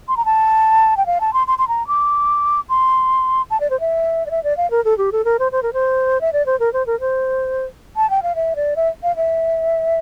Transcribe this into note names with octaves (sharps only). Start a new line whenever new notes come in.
C6
A#5
A5
G5
F5
A5
C6
C6
C6
A#5
D6
C6
A5
D5
C5
E5
D5
E5
D5
F5
A#4
A4
G4
A4
A#4
C5
C5
A#4
C5
E5
D5
C5
A#4
C5
A#4
C5
A5
G5
F5
E5
D5
E5
F5
E5